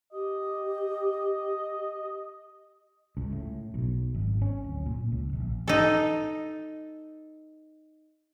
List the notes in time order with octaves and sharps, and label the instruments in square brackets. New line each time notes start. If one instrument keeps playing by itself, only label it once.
[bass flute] G4 [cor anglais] D#5
[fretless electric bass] C#2
A2
B1
G#1
C#4
D1
A#2
C#2
A#1
[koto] D#4 A4